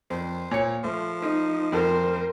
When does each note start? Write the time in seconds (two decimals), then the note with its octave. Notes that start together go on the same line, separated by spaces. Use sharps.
0.10 F2 C5
0.51 A#2 C#5 C#7
0.84 F3 A3
1.22 D#4
1.72 F2 A#4 C5